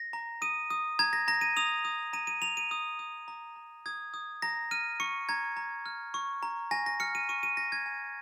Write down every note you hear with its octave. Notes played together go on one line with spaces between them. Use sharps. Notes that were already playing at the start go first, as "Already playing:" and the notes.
Already playing: A#6
A#5
D#6 D#7
D#6
A#5 G#6
A#6
A#5 A#6
D#7
D#6 F7
D#6
A#5 D#7
D#7
A#5 F7
D#7
D#6
D#6
A#5
A#5
D#6 G#6
D#6
A#5 A#6
F6 D#7
C#6 C#7
A#5 G#6
A#5
F6
C#6
A#5
G#5 A#6
A#6
F6 C#7
D#7
C#6 D#7
D#7
G#5 A#6
G#6
G#5